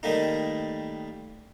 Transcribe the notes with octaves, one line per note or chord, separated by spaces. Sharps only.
D#3 G3 A3 A#3 D#4